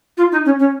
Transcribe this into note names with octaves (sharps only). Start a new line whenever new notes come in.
F4
D#4
C#4
C#4